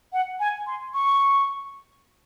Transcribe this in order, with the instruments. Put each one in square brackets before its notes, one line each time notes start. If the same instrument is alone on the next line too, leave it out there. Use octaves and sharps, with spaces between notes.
[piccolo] F#5
G#5
C6
C#6